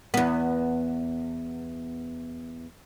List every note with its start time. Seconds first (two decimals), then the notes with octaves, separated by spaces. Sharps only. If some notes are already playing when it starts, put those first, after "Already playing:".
0.14 E2 B3